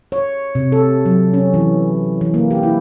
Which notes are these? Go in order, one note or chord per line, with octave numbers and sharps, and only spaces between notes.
C#5
C3
A4
F#3
C#4
E3
E3
A#3
G4
E4